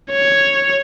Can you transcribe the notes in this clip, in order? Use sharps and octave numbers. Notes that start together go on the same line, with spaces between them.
C#5